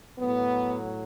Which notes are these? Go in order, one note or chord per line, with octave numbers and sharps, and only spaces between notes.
A2 F#3 B3